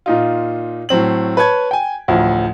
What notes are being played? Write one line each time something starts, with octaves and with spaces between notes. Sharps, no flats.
A#2 D#4 F4
A2 F#3 C4 F#7
B4 C#5 A5 G#6
G5 G#5
A1 D2 F3